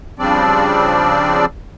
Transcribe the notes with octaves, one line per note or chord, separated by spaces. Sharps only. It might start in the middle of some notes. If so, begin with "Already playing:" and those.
C#3 F3 G3 C4 D4 D5